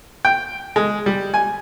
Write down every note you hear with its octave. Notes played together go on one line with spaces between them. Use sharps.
G5
G#3
G3
G#5